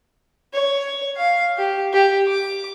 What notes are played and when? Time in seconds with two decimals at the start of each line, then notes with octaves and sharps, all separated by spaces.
0.53 C#5
1.17 F5
1.57 G4
1.93 G4
2.27 D6